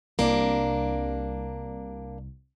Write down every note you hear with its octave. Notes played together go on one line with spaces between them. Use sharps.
C2 A#3 D4